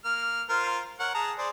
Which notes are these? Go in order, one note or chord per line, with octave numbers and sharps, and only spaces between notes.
A#3 F6
F4 A#4 C5
A#4 C#5 F#5
G#4 A5 A#5
G#4 C5 D5